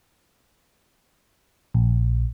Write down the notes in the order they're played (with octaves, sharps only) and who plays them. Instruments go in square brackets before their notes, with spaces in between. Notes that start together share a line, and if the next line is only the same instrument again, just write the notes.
[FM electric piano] A#1